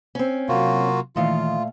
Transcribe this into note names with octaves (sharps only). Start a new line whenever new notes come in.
C4 C#4
C3 F#3 A#3 F4 F#4
A#2 D#3 E3 A3 F4 D#5 F5